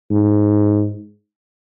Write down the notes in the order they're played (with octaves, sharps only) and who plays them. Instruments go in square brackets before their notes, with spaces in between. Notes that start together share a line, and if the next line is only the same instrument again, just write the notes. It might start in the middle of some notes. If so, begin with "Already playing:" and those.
[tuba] G#2